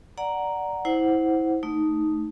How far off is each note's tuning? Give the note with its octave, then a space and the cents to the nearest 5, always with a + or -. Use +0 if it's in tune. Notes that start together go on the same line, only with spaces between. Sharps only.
D5 +0 F#5 +0 A#5 +0
E4 -25 C5 +0 F#5 +0
A3 +0 D#4 +0